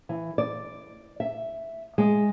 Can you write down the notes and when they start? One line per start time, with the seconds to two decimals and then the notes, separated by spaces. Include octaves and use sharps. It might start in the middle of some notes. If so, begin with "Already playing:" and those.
0.09 E3
0.38 D5
1.20 E5
1.98 G#3